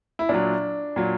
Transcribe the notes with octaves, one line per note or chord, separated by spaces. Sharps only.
E4
A#2 F#3 D4
A#2 F#3